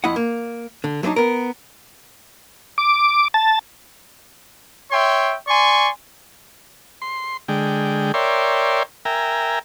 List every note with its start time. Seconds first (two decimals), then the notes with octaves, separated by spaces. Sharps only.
0.04 F2 E4 D#5 F#5
0.16 A#3
0.84 D3
1.03 F#3 A3 C4 D4 D#4
1.16 B3 A#4
2.78 D6
3.34 A5
4.92 C#5 E5 G5 C6
5.47 D5 G#5 C6 C#6
7.02 C6
7.48 D3 G#3 G5
8.14 A#4 C#5 D5 E5 G5 C6
9.05 A#4 E5 G5 G#5 A#5